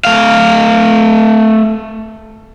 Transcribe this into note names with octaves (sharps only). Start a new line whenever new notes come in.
A3 F5